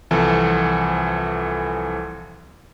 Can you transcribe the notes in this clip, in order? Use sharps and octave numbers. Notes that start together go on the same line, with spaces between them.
C2 E3 F3 A4